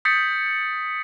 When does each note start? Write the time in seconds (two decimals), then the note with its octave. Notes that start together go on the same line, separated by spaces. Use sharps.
0.05 D#6 G6 A6 B6 C#7